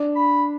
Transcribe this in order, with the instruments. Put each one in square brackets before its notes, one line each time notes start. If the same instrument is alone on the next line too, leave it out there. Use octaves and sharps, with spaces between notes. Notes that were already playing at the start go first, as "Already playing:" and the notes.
Already playing: [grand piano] D4
[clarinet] B5